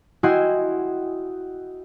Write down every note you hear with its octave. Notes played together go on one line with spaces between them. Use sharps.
E4 F#4 D#5 G5 G#5 C6